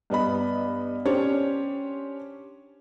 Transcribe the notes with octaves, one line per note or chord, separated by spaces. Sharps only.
G2 B3 D#5 B5
C#4 D4 G4 C5 C#5